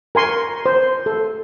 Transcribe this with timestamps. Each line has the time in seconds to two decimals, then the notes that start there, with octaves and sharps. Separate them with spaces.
0.15 A#4 G#5 C6 C#6
0.66 C5
1.06 A4